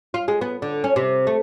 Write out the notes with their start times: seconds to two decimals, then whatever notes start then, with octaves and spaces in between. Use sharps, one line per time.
0.14 F4
0.28 G#3
0.41 B3
0.62 D3
0.84 C#4
0.96 C3
1.27 A3